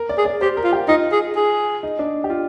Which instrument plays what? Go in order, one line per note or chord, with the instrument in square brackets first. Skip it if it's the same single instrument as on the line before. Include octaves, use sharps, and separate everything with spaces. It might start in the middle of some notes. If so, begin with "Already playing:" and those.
Already playing: [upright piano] A#4
D5
[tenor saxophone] G#4
[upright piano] D5
[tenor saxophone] G4 [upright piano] C5
[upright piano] A#4
[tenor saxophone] F4
[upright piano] G4
[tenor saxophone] D#4 [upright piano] F4
[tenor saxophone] G#4
G#4
[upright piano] D#4
D4
G4
F4